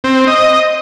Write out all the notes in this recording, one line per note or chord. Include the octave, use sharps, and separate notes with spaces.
C4
D#5